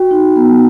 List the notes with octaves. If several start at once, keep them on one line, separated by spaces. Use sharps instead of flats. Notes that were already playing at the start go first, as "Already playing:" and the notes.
Already playing: F#4 G5
D#4
B3